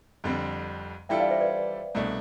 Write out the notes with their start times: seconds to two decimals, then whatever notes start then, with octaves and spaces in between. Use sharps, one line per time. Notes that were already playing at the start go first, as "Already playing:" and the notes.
0.24 F2 D3 G3 C4
1.09 E3 G3 D4 F4 A4 E5 G5
1.20 D5 F5
1.30 C5 E5
1.41 B4 D5
1.95 C2 B2 A3 D4